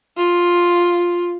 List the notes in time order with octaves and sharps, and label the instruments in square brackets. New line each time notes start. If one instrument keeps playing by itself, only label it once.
[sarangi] F4